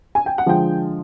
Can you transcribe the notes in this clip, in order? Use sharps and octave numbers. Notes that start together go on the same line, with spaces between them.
G#5
G5
F#5
D3 F3 G#3 G5